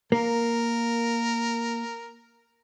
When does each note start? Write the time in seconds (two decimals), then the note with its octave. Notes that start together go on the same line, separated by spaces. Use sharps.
0.12 A#3 A#4